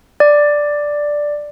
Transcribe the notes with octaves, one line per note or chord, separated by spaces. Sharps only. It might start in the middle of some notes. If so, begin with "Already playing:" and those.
D5